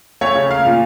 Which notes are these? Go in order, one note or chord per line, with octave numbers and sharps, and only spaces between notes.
A3 C#5
C#3
A#3 F5
A#2